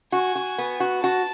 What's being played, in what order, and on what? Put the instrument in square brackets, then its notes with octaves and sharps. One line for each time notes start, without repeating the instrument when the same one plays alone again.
[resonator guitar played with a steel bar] F#4 [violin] G#5
[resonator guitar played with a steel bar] F#4
B3
F#4
[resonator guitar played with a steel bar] F#4 [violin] A5